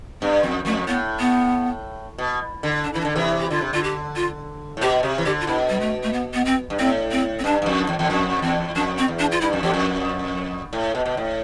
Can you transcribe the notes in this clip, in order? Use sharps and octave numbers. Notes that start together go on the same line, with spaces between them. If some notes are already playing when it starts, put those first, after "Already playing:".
G2 C4
F2 C4
F2 A3
A2 B3
B3
B2
D3
D4
E3 E4
D4
D3
C3 E3 E4
G4
D3 F4
C3
D3 F4
G4
F4
A2
B2 G4
C3 G4
E3
D3 G4
F4
B2 E4
G3
A3
A3
B3
B3
C4
G2
A2 C4
C4
C4
G2 D4
G2
F2
D4
E2
E2
F2 D4
E2 C4
F2 D4
C4
E2
D4
F4
G2 E4
F2
E2 G4
F2
A2
B2
B2
A2